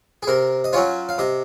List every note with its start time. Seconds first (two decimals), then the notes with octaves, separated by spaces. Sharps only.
0.23 G#4
0.27 C3 A#4
0.64 D#5
0.73 F#3 C#4 F4 C#5
1.09 F5
1.18 C3 D#5